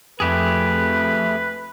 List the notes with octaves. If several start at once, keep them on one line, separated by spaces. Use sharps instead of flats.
F2 A3 G4 G#4 B4